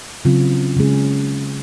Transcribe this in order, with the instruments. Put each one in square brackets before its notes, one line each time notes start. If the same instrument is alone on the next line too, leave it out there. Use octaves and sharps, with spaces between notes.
[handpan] C#3 F#3 C4 F4
C#3 G#3 C#4 G#4